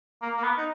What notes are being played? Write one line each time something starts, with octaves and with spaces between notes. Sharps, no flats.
A#3
A#3
B3
D#4